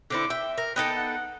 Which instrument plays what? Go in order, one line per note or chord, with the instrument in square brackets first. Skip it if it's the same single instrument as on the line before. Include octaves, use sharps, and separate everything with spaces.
[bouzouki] D3 C4 E4 [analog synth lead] D6
[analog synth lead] E5 [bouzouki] G5
[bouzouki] A#4
[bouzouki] B3 D#4 A4 [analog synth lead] G5
[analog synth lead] F#5